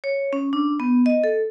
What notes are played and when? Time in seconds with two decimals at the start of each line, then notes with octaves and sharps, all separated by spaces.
0.04 C#5
0.33 C#4
0.53 D4
0.80 B3
1.06 D#5
1.24 A4